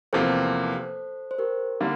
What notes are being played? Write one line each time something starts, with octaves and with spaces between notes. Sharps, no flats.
E2 C3 F3 A#3 A4 C5
C5
G4 A#4
D3 G3 A#3